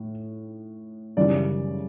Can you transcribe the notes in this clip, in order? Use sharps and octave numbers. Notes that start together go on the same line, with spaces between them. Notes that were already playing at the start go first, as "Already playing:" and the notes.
Already playing: A2
F#2 C#3 E3 G3 D5